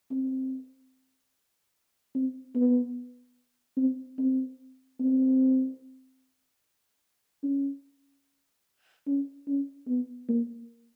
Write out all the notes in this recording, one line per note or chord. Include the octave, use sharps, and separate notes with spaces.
C4
C4
B3
C4
C4
C4
C#4
C#4
C#4
B3
A#3